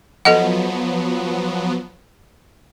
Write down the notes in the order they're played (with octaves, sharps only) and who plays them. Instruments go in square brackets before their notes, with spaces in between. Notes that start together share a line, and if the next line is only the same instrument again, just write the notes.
[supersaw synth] F3 F#3 B3 [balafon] A4 D#5 F#5